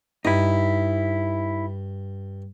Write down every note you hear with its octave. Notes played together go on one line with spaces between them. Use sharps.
G2 D#4 E4